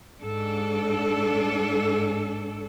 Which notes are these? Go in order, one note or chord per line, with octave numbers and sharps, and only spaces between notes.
G#2 D4 A4